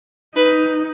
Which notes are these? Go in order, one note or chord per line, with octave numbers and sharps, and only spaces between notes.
D#4 B4